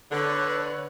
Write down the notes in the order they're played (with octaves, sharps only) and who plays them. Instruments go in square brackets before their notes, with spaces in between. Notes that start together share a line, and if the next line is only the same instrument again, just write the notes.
[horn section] D3 [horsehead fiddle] B4 C#5